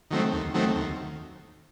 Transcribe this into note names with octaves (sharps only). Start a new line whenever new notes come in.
D#3 F#3 A3 C4
D#2
D#3 F#3 A3 C4
D#2